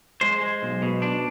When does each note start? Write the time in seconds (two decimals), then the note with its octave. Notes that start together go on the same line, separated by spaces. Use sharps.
0.21 G#3 C5
0.42 G#3
0.63 B1
0.82 B2
1.02 D4